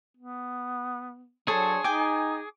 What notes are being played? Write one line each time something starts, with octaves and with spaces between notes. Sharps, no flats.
B3
F#3 D4 G#4 A4 C5 C#5
D#4 G5 G#5 D6